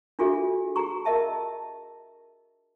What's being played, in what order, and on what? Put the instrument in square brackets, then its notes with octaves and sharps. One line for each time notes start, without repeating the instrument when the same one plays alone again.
[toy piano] D4 F4 F#4 G#4 A4 E5
G4 G#4 A#5 C#6
A#4 D#5 E5 A5